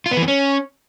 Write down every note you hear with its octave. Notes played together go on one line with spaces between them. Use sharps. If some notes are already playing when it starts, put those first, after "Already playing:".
F4
B3
E3
B3
C#4